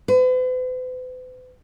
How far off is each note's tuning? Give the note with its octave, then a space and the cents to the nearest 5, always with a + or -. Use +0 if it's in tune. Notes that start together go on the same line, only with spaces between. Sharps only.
B4 +45